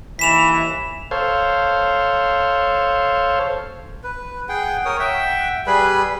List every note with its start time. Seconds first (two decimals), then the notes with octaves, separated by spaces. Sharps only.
0.19 D#2 E3 B6 E7 F7
1.11 A4 C5 C#5 F5
4.04 B4
4.49 G#4 F#5 G5
4.85 A#4 C#5 D#6
4.99 E5 F#5 G5
5.67 G3 G#4 B4 B5